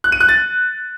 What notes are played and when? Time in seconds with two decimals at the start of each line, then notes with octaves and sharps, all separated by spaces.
0.04 F#6
0.12 D#7
0.20 F#6
0.29 A6